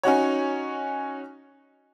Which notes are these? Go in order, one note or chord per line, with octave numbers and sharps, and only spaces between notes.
C#4 D#4 F#4 C#5